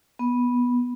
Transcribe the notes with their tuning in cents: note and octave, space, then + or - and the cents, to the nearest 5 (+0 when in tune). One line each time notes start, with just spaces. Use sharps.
B3 -10